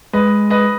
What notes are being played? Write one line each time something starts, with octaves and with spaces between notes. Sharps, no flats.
G#3 B4 D#5
B4 D#5